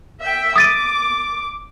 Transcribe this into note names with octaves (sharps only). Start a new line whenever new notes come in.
E5 G5
D6 D#6 A6 D#7